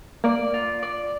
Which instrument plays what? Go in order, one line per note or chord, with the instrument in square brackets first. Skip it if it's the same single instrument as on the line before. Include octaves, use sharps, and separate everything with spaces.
[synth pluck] A#3 [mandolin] D5
[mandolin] F4
D5